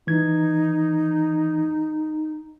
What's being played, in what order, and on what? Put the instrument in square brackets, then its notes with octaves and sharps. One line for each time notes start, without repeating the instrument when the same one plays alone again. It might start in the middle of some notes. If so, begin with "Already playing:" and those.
[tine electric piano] E3 G#6 [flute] D#4